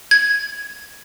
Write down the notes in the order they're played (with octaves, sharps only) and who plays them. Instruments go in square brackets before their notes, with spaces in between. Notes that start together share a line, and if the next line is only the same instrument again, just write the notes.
[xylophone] G#6